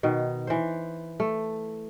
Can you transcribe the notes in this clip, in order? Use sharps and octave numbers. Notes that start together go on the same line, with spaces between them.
B2 D#3
E3 C5
A3